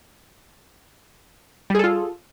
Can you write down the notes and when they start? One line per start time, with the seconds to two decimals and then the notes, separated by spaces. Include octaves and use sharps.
1.70 G3
1.75 G#4
1.79 A4
1.84 F4